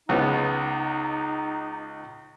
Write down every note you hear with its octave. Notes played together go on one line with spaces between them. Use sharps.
C#2 B3 D#4 D#6